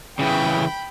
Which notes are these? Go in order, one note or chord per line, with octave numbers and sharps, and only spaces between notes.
C#3 E3 G5 B5